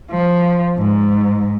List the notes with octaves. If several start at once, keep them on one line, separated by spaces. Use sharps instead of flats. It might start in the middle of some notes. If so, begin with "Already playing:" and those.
F3
G#2